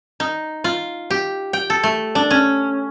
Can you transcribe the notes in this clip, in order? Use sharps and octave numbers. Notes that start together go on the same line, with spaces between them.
D#4
F4
G4
G5
A4
A3
D4
C#4